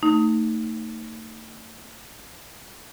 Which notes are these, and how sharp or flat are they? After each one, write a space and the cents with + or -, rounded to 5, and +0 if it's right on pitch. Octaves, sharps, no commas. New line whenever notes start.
A3 +35 D#4 +0